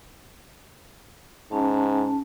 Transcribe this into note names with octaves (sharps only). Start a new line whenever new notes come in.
G#2 C#4 A5